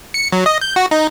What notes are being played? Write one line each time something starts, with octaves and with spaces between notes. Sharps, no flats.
C#7
F#3
D#5
G6
F#4
D#4